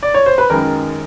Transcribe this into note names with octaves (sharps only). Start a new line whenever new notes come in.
D5
C#5
C5
B4
F#2 D#3 G#3 A#4